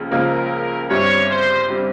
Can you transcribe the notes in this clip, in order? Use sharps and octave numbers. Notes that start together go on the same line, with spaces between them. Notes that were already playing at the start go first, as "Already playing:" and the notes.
Already playing: C#2 C#3 F3 A#3
C#2 C#3 F3 A#3 A#4
G1 G2 G3 C4 C#5
C5
G3 C4